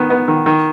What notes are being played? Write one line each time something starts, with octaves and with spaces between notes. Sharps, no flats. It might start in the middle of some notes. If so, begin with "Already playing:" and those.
Already playing: D#3 B3
B3
D#3
D#3